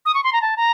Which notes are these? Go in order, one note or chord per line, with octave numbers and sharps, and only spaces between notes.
D#6
C#6
C6
A#5
A5
A#5